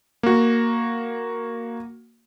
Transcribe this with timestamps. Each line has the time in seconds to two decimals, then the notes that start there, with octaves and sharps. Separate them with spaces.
0.23 A#3 F#4